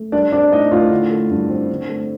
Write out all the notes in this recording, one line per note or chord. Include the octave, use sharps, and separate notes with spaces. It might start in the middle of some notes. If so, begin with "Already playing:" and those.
Already playing: A3
G3 D4 D5
C4 D4 D5
A2 D#4 D#5
A2 F4 F5
D3
A3
G2
C4
D3
A3